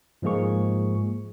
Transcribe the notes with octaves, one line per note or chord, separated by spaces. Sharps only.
G#2 F3 G#3 A#3 G#4 C#6